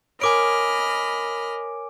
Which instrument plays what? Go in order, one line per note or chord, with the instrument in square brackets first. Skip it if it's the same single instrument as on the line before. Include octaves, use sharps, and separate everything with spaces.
[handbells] A#4 C#5 [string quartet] D#5 B5 F6 [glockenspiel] G#5 D6 D7